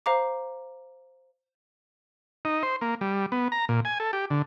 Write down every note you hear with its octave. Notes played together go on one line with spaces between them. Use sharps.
C5 F5 A#5 D6
D#4
C5
A#3
G3
B3
A#5
A#2
G#5
A4
G4
D3